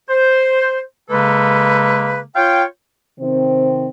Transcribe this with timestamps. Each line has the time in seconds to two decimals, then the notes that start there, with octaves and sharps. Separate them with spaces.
0.09 C5
1.10 C#3 G#3 A#3 A4 B4
2.36 F4 C#5 F5 G5
3.20 C3 D#3 C4